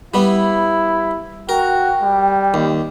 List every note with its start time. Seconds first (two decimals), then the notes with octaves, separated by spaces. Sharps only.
0.14 G3 B3 E4
1.49 F#4 A#4 G5
2.03 G3
2.54 D#2